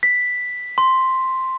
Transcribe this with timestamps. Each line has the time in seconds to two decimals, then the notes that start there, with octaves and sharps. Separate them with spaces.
0.03 B6
0.78 C6